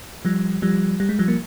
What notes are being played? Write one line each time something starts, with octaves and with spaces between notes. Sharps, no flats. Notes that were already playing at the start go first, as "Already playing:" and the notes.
F3 G3
F3 G3
G3
G#3
F3 G3
A#3